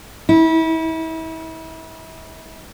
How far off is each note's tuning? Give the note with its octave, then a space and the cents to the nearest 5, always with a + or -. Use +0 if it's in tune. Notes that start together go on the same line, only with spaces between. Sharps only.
E4 -35